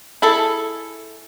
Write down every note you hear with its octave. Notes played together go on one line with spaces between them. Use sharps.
E4 G#4 A4